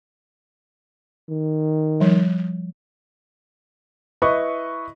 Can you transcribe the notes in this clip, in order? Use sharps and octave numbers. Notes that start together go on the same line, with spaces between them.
D#3
F3 G3
E4 B4 D#5 C#6